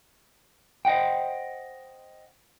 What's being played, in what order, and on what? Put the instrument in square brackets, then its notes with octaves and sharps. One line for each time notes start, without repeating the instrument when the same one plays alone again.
[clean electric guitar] C5 D#5 F#5 G5